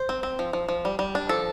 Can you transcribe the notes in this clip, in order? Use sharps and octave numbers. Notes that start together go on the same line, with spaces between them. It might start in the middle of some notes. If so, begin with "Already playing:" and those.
Already playing: C5
C4
C4
F3
F3
F3
G3
G3
D4
F3 A4